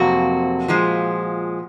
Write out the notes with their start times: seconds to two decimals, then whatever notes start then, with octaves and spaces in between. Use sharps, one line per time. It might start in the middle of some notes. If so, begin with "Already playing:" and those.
Already playing: F2 C3 F#3 A#3 F#4
0.68 A#2 F3 G#3